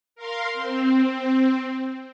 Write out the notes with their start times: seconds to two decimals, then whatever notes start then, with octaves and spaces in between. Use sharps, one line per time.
0.16 A#4 F5 C6
0.54 C4